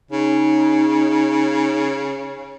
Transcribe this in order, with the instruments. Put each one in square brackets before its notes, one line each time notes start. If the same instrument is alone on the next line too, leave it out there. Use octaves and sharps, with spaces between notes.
[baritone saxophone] C#3 [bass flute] D#4